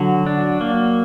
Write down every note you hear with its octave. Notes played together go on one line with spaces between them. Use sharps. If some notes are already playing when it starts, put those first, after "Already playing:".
Already playing: D3 F#3 F#4
D4
A#3